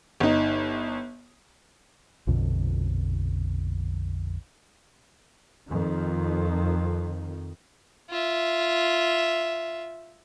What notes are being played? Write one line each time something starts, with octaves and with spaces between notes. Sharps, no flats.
G1 D#4
A#1 F2 B2 D3
F2 D#3
F4 E5